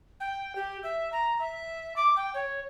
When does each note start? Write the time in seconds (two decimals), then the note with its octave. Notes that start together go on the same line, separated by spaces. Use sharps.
0.20 G5
0.55 G4
0.83 E5
1.12 A#5
1.39 E5
1.96 D6
2.16 G5
2.34 C#5